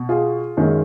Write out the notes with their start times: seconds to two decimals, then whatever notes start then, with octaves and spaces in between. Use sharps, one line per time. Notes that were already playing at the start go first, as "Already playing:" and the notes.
Already playing: B2
0.09 F4 G#4
0.57 F#2 D#3 G#3